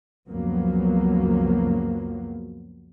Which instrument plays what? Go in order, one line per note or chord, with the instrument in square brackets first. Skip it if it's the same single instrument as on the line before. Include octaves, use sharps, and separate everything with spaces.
[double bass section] C#2 F#2 F3 F#3 A#3 B3